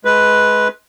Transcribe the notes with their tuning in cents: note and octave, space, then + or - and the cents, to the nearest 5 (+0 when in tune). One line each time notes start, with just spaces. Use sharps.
G#3 +25 B4 +0